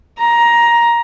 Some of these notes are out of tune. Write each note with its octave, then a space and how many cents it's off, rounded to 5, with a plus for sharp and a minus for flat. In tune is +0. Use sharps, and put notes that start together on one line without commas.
A#5 +15